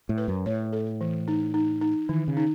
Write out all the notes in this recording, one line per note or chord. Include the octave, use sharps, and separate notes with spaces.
A2
B4
F#2
A2 C#5
A4
E3
D#4
D#4
D#4
D#3 E3
C#3
D#4